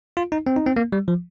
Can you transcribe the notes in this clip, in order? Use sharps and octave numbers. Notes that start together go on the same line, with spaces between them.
F4
D#4
C4
D#4
C4
A#3
G3
F3